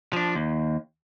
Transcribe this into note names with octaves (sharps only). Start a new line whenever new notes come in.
F3 D4
D#2